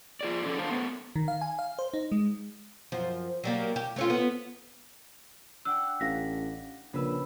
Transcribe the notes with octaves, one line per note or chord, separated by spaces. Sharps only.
F4 G#4 D5
F3 C#4 A4 D5
E2 D4 C5 F5 A5
A3 B3
D#3
F5
G#5
F5
C5
D#4
G#3
F#2 F3
F#3 G3 A#3
G4
A3 C#4 F4
B3
D4 F#5 G5 E6 F#6
A1 F5 A#6 B6
A#1 C#3 B4 E6